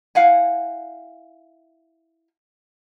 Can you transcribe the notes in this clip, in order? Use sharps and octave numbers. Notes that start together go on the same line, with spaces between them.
E4 F5 F#5 G#5